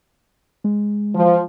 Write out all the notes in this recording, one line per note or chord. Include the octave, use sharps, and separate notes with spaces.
G#3
F3